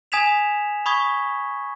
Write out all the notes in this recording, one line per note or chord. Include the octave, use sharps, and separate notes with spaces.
G#5 D#6 G#6 B6 E7 F7
B5 C#6 D#6 G#6 B6 G7